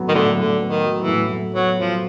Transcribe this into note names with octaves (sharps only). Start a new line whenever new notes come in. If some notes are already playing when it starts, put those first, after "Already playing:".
Already playing: A2 F#3 B3
D#3
A2 D3
A2 D3
B3
D#3
F#3
E3
A2
A2
F#3 B3
F3 F#3